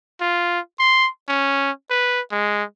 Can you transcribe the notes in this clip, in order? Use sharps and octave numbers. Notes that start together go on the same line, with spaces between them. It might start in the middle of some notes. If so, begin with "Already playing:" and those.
F4
C6
C#4
B4
G#3